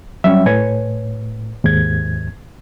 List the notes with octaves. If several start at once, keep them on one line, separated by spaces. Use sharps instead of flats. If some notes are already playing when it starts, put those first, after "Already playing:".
F#3 G3 C#4 E5
A2 B4 C#5 G#5
D#2 G#2 G#6